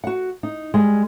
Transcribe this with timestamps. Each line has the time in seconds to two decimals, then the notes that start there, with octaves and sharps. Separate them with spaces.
0.04 F#4 F#5
0.43 D#4
0.74 G3 G#3